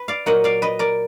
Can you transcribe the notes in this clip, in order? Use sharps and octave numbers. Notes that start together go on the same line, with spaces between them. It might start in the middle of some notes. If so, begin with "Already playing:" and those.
Already playing: B4
D5 F5
A#2 F#3 A#3 D#5 F#5
D5 F5
B4 D#5
A#4 D5